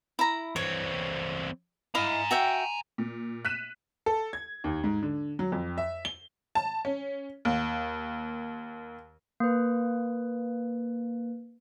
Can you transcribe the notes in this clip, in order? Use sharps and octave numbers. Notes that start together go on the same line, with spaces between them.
E4 A#5
E3 C4 C#5
E4 D#5 F5 G#5 A#5
F#4 E5 G5
A#2
F#6 B6 D#7 E7
A4
G#6
D#2
G#2
D3
F#3
F2
E5
G7
A5
C#4
D#2
A#3 B4